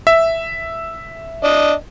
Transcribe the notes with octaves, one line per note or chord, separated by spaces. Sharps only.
E5
D4 D#5